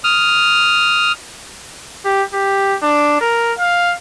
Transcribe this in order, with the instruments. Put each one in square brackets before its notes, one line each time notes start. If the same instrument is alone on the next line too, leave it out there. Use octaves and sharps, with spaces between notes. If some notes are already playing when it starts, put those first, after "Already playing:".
[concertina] D#6 F6
[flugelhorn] G4
G4
D4
A#4
F5